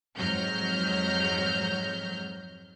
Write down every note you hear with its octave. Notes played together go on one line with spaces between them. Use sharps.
F2 G#2 F#3 F6 G6 A#6